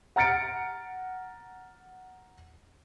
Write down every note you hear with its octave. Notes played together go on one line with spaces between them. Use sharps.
F#5 A#5 F6 A6 C#7 D7